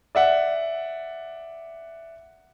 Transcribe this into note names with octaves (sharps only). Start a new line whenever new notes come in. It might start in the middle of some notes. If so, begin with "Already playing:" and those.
D5 E5 F#5